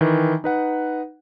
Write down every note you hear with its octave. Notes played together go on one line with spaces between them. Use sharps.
D#3 E3
D#4 B4 F#5